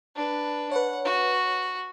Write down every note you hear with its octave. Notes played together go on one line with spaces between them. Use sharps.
D4 B4
B4 C#5 F#5
F#4